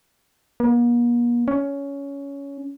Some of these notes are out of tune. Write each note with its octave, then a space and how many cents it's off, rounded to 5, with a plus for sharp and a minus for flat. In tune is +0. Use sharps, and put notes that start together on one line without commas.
A#3 +45
C#4 +15